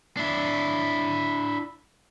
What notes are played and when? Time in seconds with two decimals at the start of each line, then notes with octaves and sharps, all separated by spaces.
0.17 D4 E4